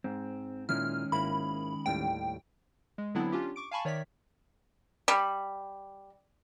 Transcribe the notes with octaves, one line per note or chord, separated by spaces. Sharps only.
G#2 C4
A#2 D#3 G#3 C#4 E4 F6
G#1 A#3 E4 B5
D#2 A2 G3 G5
G#3
D3 F#3 B3 C4 D4 E4
C#4 D4 F4 G4
C#6 D6 D7
F5 G#5 A5 B5 C#6
D#3 C#5 D5 E5 B6
G3